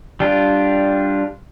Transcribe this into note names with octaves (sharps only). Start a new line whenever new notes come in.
G3 D4 F4